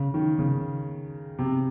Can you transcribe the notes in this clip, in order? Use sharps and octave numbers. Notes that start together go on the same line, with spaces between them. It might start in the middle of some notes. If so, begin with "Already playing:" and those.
Already playing: C#3
D#3
C#3
C3